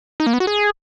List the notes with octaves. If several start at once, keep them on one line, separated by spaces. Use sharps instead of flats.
D#4
A#3
B3
F#4
G#4